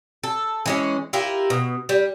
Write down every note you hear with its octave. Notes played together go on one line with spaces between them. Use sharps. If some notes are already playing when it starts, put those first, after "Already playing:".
A4
E3 G#3 C#4
E4 F4 G4 A#4
B2
G3